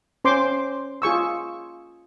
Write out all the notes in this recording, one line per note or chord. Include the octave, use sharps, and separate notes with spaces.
C#4 C5 C6 D6
F4 G#4 C#6 E6